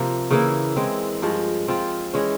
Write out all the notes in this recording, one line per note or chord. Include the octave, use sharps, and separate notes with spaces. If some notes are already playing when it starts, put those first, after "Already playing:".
Already playing: C3 F3 A#3
C#3 E3 A#3 E4
E3 G#3 C4
G2 F3 G#3
F3 C4 F4
E3 G#3 C#4